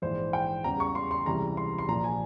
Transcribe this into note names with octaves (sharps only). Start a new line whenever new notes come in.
A#1 G#2 E3 C5
G5
E2 C#3 G3 A#5
C#6
C6
C6
C#2 C3 E3 G3 A#5
C6
C6
A#1 A#2 F3 A#5
G#5